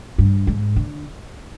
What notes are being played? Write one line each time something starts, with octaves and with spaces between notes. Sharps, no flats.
G2
G#2
D3